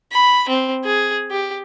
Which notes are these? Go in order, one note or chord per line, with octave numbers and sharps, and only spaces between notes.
B5
C4
G#4
G4